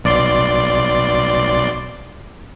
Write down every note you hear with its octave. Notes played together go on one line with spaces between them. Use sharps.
B1 D5 C6